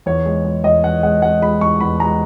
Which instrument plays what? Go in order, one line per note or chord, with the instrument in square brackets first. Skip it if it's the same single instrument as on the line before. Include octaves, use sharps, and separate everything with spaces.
[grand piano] E2 C#5
G#3
G#3
E2 D#5
E2 F#5
G#3 F#5
G#3 F#5
G#3 B5
E2 C#6
E2 B5
G#3 A#5